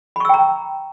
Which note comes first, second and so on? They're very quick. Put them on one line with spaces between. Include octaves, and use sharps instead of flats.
B5 C#6 E6 G5 A#5